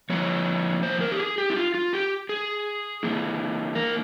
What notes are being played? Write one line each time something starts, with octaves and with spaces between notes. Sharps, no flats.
F3 A#3 E4 C#5
C5
A#4
G4
G#4
G4
E4
F4
F4
G4
G#4
E3 A#3 E4
A#4